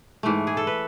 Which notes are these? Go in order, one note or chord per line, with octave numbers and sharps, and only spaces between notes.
G#2 E3 A3
G#4
A4
B4